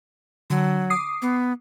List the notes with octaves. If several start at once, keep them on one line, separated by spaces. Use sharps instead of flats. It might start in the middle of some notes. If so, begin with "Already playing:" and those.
D3 F#3
D6 D#6 C7
B3